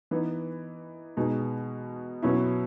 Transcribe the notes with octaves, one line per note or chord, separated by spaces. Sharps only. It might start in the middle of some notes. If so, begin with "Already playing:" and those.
E3 B3 D#4
B2 G#3 D#4
B2 F#3 C#4 E4